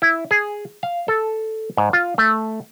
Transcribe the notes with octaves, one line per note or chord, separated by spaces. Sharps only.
E4
G#4
F5
A4
G#2
F4
A3